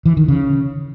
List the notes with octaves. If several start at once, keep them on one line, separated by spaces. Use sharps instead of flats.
E3
D#3
C#3